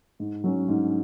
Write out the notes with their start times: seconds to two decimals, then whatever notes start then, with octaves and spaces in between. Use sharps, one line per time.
0.20 G#2
0.44 F#3 C#4
0.68 G#2